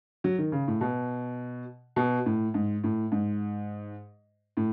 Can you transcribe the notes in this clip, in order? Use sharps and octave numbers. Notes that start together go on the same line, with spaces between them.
F#3
D#3
C#3
A2
B2
B2
A2
G#2
A2
G#2
A2